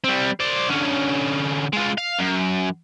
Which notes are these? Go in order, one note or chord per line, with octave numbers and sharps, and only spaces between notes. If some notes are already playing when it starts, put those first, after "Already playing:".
G3 C4
C5 D5
D3 C#4
G#3 F4
F5
F#2